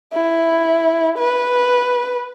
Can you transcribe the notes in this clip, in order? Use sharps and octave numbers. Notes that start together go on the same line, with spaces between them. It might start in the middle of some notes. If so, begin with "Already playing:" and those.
E4
B4